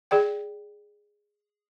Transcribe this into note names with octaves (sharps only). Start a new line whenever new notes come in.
G#4 D5 G5